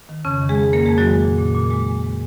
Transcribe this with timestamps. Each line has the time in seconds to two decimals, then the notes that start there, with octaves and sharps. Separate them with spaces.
0.09 D#3
0.25 F2 C#3 C#4
0.41 D#3
0.49 G#3 G#4
0.57 F2
0.73 G#3 A#3 A#4
0.86 F2 G#3 G#4
0.98 F#3 F#4
1.06 D#3 G#3
1.22 A#2
1.38 A#2
1.54 A#2
1.70 A#2 G#3
1.87 G#3
2.03 G#3